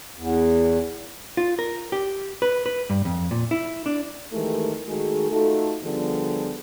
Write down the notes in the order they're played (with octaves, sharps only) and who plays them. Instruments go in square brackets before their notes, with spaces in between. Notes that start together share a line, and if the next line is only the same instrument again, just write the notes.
[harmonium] E2
[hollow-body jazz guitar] F4
A#4
G4
B4
B4
G2
F2
A#2
E4
D4
[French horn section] D#3 E3 G#3 A3 G4 A#4
D#3 G#3 A3 F#4 G#4
A3 D#4 F4 F#4 A4
D3 F3 G3 B3 G4 G#4